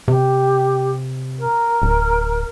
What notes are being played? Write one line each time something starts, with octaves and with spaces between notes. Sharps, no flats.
C3 G4
A#4
D1